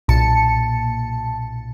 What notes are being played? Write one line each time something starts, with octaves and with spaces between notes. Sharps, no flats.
B1 A#2 A5 C#7